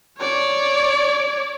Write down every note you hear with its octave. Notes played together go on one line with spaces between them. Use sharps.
C#5 D5